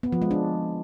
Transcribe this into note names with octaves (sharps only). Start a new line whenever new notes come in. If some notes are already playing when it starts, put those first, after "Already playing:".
B3
F3
G#3
D4